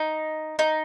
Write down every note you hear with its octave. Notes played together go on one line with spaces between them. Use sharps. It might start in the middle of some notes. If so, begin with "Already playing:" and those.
Already playing: D#4
D#4